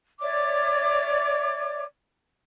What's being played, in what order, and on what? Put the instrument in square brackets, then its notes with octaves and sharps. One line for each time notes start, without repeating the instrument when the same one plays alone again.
[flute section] C#5 D5 E5 D6